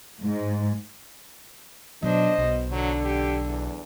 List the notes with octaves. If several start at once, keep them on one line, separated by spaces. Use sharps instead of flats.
G#2
B2 F#3 D4 C5 D#5
B1 B2
D3 F#3
G4
E2